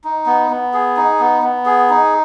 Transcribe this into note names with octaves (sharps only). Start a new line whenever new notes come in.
D#4
B3
B3
G#4
D#4
B3
B3
G#4
D#4